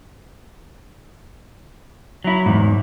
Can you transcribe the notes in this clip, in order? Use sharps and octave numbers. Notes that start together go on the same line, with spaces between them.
F#3 E4
E2 G#2